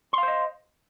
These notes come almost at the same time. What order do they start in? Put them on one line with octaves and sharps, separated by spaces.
C6 F5 C5 D#5